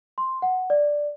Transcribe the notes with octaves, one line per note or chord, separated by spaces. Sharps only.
C6
F#5
D5